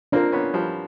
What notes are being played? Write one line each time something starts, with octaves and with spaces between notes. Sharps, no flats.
A#3 C4 D4 F4 A#4
B3 C#4
F3 G3